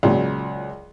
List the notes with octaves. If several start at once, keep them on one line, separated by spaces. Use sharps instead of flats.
C#2 A#2 F#3